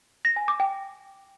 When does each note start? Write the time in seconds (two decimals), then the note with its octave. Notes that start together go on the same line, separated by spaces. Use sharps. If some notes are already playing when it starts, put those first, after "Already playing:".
0.25 A#6
0.36 G#5
0.48 D6
0.60 G5